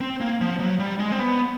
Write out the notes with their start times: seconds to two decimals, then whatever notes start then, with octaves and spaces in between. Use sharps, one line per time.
0.01 C4
0.21 A#3
0.41 F3
0.59 F#3
0.79 G3
0.99 G#3
1.12 C4
1.19 B3